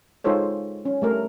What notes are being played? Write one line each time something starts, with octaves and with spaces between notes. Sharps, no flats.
G#3 D#4 F4 A4 C5 C#5
C#4
G3 A3 A#4